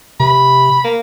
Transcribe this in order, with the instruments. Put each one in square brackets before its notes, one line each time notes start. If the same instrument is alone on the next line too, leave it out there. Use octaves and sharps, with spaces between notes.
[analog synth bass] C3 [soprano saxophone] B5
[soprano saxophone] A#3